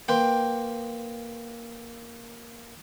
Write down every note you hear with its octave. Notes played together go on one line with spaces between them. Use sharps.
A#3 B4 G5 C6